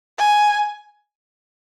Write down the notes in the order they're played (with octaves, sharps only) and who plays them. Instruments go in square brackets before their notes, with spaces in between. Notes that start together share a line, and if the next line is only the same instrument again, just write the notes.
[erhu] G#5